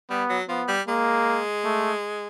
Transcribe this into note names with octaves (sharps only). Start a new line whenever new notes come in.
G3 B3
F#3
F3 B3
G3
G#3 A#3
A3